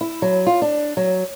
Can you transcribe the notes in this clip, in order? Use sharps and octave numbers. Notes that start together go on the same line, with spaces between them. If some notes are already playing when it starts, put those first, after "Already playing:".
E4
F#3
F4
D4
F#3